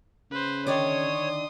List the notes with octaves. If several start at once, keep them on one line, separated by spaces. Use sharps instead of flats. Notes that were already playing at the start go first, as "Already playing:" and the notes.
C#3 B4 C5
D3 D#3 C#5 D5 C6 D#6